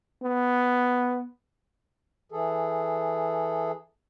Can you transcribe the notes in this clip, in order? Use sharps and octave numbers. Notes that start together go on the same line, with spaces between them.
B3
E3 G#4 A4